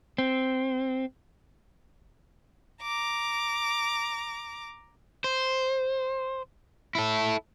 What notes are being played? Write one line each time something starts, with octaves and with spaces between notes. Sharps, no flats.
C4
A#5 D6
C5
E4 A4